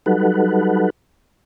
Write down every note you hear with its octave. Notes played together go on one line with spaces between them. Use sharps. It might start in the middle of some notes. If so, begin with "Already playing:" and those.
F#3 G3 D#4 A4 B4 F#5